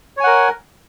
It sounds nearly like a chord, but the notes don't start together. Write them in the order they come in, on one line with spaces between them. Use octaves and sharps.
C#5 G#5 F#5 A#4